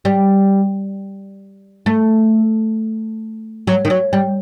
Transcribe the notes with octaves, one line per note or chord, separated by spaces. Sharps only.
G3
A3
F#3
D#3
F#3
G3